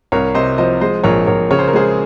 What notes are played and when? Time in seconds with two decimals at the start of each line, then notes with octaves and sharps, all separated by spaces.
0.12 C2 A#4 C#5
0.35 C3 C5 D#5
0.58 F3 C5 D#5
0.81 G#3 C5 D#5
1.04 A#1 A#4 C#5
1.27 A#1 A#4 C#5
1.51 C#3 C#5
1.59 C5
1.68 A#4
1.73 G#3 G#4 C5